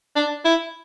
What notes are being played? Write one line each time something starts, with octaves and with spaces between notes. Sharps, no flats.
D4
E4